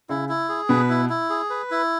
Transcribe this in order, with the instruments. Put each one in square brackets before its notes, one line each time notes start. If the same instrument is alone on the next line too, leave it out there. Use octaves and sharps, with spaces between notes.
[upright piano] C#3 [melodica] E4
[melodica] E4
G#4
[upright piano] B2 [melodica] B4
[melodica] E4
E4
G#4
B4
E4